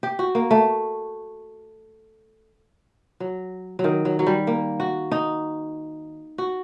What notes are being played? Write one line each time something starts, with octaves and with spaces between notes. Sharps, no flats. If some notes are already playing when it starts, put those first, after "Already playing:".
G4
F#4
A#3
A3
F#3
F#3
D#3
F#3
F#3
G3
A#3
F#4
D#4
F#4